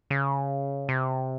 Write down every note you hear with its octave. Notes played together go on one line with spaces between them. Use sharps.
C#3
C3